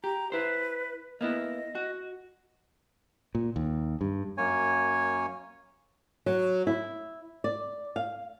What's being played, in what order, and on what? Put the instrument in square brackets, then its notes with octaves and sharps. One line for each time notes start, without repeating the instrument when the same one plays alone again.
[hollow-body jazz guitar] G4 [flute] A#5
[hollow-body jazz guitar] E4 C5 [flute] B4
[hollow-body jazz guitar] A#3 B3 E4 [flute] D#5
[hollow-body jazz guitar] F#4
[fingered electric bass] A#2
D#2
G2
[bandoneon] F#2 A#3 C#5 G#5
[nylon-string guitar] F#3
E4
D5
F5